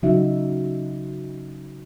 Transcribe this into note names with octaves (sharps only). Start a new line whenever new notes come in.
C#3 F#3 D#4 F#4 E5